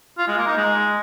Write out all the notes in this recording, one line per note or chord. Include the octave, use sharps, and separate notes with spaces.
F4
G#3
A#3
D#4
G#3